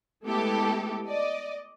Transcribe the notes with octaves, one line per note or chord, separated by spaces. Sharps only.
G#3 A3 B3 E4 G4 A4
D5 D#5